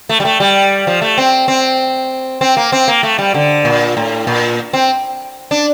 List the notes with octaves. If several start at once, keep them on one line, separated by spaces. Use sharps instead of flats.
A3
G3
A3
G3
F3
A3
C4
C4
C4
A#3
C4
A#3
A3
G3
D3
A#2
A2
A#2
C4
D4